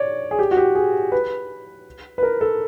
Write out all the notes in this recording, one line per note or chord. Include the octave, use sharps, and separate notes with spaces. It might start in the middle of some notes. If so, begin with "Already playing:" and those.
Already playing: C#5 D5
G#4
G4
F#4
G4
G#4
B4
B4
A#4
A4